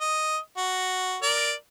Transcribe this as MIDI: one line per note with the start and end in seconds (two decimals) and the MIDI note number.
0.01 0.37 75
0.58 1.17 66
1.23 1.52 70
1.23 1.52 74